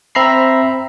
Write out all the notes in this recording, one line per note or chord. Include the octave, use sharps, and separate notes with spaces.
C4 E5 A#5 B5 C7